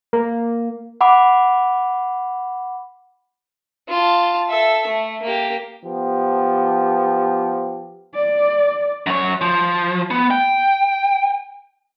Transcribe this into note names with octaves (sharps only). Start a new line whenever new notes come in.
A#3
F#5 B5 D6
F4 A5
A4 E5
A3
A#3 G4
F3 B3 G4
D5
F#2 C#5
F3
B3
G5